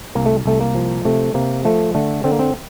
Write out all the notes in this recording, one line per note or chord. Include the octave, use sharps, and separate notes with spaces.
C2 A#3
A3
C2 A3
A#3
F3
C3 A3
C3 A#3
F3 A3
D3 A3
D3 C4
A#3
C4